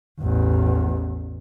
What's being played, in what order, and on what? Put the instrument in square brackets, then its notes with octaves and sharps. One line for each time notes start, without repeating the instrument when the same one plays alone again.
[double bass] A1 E2